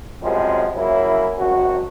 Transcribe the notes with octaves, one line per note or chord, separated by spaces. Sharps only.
F#2 C3 F3 G3 G#3
C#3 F#3 A#3 E4
G#1 F#2 F#4